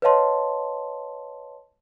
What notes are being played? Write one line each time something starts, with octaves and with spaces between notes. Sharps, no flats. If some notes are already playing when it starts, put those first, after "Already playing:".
B4 C#5 D#5 F5 A5 C6